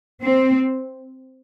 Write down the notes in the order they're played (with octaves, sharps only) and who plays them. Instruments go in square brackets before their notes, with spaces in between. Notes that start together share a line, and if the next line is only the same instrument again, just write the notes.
[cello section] C4